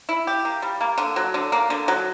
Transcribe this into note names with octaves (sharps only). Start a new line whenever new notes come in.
E4
G4
A#3
G3
A#3
D3
F#3
D3
A#3
D3
F#3